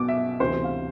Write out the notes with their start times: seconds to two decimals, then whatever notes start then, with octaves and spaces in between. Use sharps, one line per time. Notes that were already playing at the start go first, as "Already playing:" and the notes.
Already playing: B1 B2 D6
0.08 E5
0.40 D2 C3 E3 C5
0.64 F5